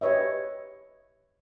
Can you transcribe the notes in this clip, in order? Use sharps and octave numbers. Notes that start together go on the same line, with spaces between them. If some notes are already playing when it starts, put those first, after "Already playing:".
G4 B4 C#5 D#5 E5